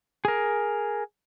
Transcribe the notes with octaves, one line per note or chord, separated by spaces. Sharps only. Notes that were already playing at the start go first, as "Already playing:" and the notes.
G#4 A#4